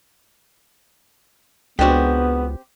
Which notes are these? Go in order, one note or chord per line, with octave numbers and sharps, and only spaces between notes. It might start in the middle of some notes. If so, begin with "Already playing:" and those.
C#2 G#3 B3 C4 D4 F#4 G4